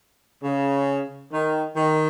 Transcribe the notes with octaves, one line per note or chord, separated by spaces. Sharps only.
C#3
D#3
D#3